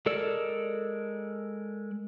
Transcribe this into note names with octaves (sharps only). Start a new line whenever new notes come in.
G#3 A4 A#4 D5 E6